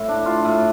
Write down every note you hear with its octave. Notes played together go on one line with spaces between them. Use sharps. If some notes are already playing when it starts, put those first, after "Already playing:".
Already playing: A2 E4
D4
F4
A2